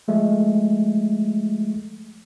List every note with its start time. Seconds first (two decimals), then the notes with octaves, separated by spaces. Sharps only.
0.08 F3 G#3 A3